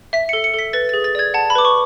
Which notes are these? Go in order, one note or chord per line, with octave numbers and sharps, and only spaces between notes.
E5 B6
A4 C#7
C#7
A4 B6
B4 A6
G#4 A6
A6
D5 G#6
F#5 A5
B5
B4 D6
C#6